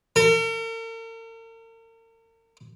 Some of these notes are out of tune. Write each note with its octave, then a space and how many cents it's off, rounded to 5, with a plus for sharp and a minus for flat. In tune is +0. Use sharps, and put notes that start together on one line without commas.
A#4 -45